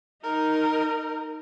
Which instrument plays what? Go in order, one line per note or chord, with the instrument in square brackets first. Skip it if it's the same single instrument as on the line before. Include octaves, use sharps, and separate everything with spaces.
[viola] D#4 [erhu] A#4